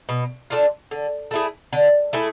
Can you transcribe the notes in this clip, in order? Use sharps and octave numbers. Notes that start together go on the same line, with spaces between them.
B2
A3 D4 F4
D3
A3 E4 G#4
D3
A3 E4 G#4